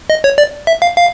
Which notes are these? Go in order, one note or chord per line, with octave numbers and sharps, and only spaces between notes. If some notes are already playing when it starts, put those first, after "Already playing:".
D#5
C#5
D5
E5
F5
F5